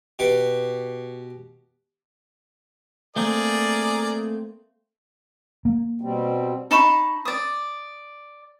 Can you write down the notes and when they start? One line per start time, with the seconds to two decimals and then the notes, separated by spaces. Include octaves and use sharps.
0.19 B2 G4
3.16 A3 A#3 C4 G#4 A#4 D5
5.65 A#3
6.01 B2 G3 C4
6.71 D#4 A5 B5 C#6
7.25 D5 D#6